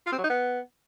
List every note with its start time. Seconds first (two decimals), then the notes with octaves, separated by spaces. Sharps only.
0.06 F4
0.12 C4
0.18 F#3
0.24 D#4
0.30 B3